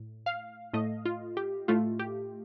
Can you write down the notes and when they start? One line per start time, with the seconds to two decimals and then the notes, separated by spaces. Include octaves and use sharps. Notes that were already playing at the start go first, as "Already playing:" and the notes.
Already playing: A2
0.26 F5
0.73 A2 A3 D#5
1.05 F4
1.37 G4
1.68 A2 A3 F4
1.99 G4